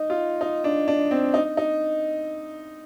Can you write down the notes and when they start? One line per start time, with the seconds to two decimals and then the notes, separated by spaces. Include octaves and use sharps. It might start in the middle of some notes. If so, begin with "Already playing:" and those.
Already playing: D#4
0.10 F4
0.41 D#4
0.64 D4
0.88 D4
1.11 C4
1.34 D#4
1.57 D#4